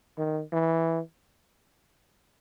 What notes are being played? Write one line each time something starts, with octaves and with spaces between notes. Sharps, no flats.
D#3
E3